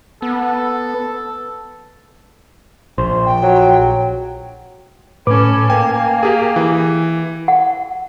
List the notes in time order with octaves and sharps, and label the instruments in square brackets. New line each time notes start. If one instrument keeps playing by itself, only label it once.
[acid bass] B3 [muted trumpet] A4
[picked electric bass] A#1 [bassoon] C5
[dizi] G5
[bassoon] F#3
[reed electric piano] A2 B4 D6 [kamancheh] C#4 A4
[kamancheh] A#3 [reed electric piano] G5 [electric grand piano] G#5
[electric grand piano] G4 G#4
E3
[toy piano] F#5